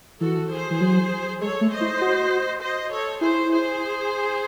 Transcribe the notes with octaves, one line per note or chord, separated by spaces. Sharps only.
E3 F#4 A4
G#4 C5
E3
F#3
G#3 A4 C#5
A3
C5 D#5
E4
F#4
C5 D#5
A4 C#5
E4 G#4 C5
G#4 C5